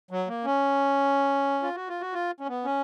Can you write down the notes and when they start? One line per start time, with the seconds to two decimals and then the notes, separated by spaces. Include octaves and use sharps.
0.11 F#3
0.28 A#3
0.44 C#4
1.63 F4
1.75 F#4
1.89 F4
2.01 F#4
2.13 F4
2.40 C#4
2.48 B3
2.65 C#4